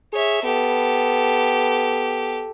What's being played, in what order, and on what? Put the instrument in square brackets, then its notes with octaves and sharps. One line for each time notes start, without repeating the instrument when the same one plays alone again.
[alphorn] G#4 [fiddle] C#5 E5
[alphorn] B3 [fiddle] G4 A4